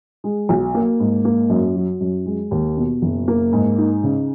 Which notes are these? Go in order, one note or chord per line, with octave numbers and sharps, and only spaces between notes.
G#3
B1
A#3
G#2
A#3
F#2
F#3
F#2
G#3
D#2
B2
F#1
A#3
G#2
D#4
C#3